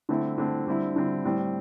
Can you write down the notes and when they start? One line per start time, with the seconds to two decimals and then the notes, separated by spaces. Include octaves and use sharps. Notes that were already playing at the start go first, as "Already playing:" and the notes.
0.09 D3 A3 C4 E4
0.38 D3 A3 C4 E4
0.67 D3 G3 C4 E4
0.96 D3 G3 C4 E4
1.25 A2 G3 C4